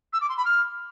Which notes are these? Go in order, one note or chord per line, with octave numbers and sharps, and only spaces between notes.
E6
D6
C6
B5
F6